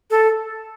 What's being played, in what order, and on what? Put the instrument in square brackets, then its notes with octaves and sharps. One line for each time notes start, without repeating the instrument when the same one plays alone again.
[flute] A4